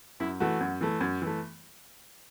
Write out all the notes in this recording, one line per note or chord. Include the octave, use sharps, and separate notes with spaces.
F#2 E4
E3 A3 F#4
F#2
E3 A3
F#2
E3 A3